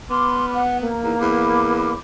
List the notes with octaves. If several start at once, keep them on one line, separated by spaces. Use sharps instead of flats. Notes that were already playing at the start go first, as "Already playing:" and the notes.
B3 B5 C6 D6 F6
F#5
A#3 A#5
E2 D#4 A#4 A#5
E2 B5 D6